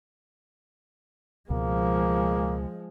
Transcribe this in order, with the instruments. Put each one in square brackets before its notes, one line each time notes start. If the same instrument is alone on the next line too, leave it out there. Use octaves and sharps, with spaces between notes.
[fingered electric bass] C#2 B2 [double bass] F3 G#3 [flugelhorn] A#3